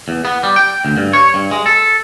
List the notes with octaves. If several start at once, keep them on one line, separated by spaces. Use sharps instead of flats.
E2
B3
G3
G5
D2
G2
C#5
G2
G#3
A4